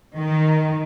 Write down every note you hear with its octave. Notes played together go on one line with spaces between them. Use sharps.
D#3